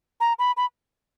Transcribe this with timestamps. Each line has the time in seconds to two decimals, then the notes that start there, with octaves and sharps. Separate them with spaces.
0.20 A#5
0.39 B5
0.57 B5